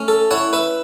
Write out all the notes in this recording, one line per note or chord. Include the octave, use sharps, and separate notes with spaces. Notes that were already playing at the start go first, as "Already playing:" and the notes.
Already playing: A3 C#4
A4
E4 C#5 F#5
B4 E5